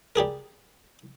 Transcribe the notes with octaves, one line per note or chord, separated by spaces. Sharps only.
G3 G4 G#4 A#4